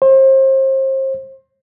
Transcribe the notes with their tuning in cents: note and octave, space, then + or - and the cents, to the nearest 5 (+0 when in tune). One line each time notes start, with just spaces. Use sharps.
C5 +35